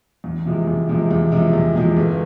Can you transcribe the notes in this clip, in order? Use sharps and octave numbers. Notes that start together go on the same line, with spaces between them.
E2
C3 F3 G#3
E2
C3 F3 G#3
E2
C3 F3 G#3
E2
C3 F3 G#3
G1